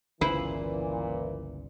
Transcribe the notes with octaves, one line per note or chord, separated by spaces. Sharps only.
G1 C#2 A#2 C#3 E3 E4 B4 C5